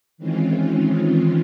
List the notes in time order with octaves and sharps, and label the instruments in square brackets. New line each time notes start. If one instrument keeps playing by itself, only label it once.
[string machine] D#3 E3 G#3 C4 C#4 F4